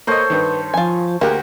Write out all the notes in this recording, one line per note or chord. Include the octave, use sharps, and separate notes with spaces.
A#3 A4 C5 C#5 D#5
G2 D#3 B4
F3 F4 G#5
D2 A#3 G4 G#4 F#5